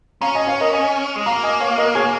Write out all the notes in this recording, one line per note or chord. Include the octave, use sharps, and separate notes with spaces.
C#4 F5 A#5
D#5 G#5
C#5 F5
A#4 D#5
D#5 G#5
G#3
A#3 F5 A#5
D#5 G#5
C#5 F5
F5
A#4 D#5
G#4 C#5